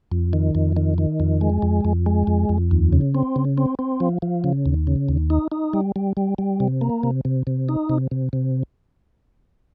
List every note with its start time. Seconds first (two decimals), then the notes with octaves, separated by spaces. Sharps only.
0.12 F2
0.33 D#3
0.55 F2
0.77 D#3
0.98 D#3
1.20 F2
1.41 G#3
1.62 F2
1.85 F2
2.06 G#3
2.27 F2
2.49 F2
2.71 D#2
2.93 C#3
3.15 C4
3.36 C#3
3.58 C4
3.79 C4
4.00 F3
4.22 F3
4.44 C#3
4.66 D#2
4.87 C#3
5.09 D#2
5.30 D#4
5.52 D#4
5.73 G3
5.96 G3
6.17 G3
6.38 G3
6.60 C3
6.81 A#3
7.03 C3
7.25 C3
7.47 C3
7.69 D#4
7.90 C3
8.11 C3
8.33 C3